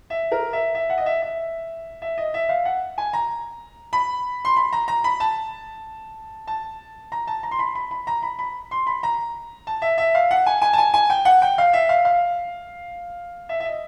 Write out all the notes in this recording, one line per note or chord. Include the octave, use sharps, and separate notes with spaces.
E5
A#4
E5
E5
F#5
D#5
E5
E5
E5
D#5
E5
F5
F#5
G#5
A#5
B5
C6
B5
A#5
A#5
B5
A5
A5
A#5
A5
A#5
C6
B5
B5
B5
A#5
B5
B5
C6
B5
A#5
A5
E5
E5
F5
F#5
G#5
G#5
A5
G#5
G#5
G5
F#5
G5
F5
E5
F5
F5
E5
E5
D#5